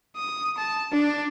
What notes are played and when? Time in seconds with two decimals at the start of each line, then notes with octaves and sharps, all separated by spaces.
0.17 D#6
0.58 A5
0.92 D4